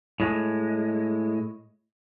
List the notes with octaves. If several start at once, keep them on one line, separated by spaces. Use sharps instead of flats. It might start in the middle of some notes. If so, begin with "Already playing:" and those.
A2 G#3